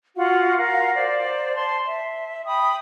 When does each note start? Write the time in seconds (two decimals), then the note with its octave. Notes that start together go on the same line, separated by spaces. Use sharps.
0.16 F4 F#4 F5 F#5
0.57 A#4 F5 F#5
0.95 C5 D5
1.55 A5 C6
1.85 E5
2.45 G5 B5 D#6